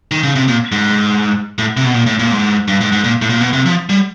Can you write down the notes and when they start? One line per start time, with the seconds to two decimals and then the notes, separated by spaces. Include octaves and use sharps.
0.11 D#3
0.23 C#3
0.35 C3
0.48 A#2
0.72 G#2
1.58 A2
1.77 C3
1.85 B2
1.94 A#2
2.06 A2
2.19 A#2
2.31 G#2
2.68 G2
2.81 G#2
2.92 G#2
3.04 A#2
3.22 A2
3.29 A#2
3.41 B2
3.53 C3
3.66 F3
3.89 G3